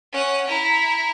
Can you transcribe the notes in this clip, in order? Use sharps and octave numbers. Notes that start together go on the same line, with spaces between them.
C#4 F#5
E4 A#5